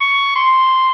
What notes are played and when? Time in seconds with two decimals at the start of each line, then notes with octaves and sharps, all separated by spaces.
0.01 C#6
0.35 C6